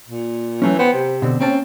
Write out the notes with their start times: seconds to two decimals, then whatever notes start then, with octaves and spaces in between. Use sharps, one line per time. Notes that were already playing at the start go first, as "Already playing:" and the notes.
0.08 A#2
0.62 E3 F#3 A3 C#4
0.79 B3 C5 G5
0.94 C3
1.22 B2 D3 C4
1.40 A#3 C4 C#4 A5